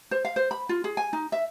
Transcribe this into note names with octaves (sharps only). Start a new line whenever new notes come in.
C5
F5
C5
B5
F4
G#4
G#5
D#4
E5